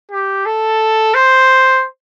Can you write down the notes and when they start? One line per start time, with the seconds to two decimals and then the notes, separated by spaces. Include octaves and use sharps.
0.11 G4
0.46 A4
1.14 C5